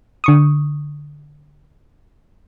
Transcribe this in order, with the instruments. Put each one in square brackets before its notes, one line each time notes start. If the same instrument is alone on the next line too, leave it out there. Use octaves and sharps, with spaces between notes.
[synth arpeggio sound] D3 C#6 D#6